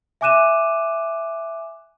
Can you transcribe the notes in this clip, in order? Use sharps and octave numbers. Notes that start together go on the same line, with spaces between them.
E5 G#5 D6 F#6 D#7 E7